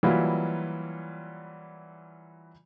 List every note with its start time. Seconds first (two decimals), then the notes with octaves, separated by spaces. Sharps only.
0.03 E3 F#3 G3 A#3 E4 F4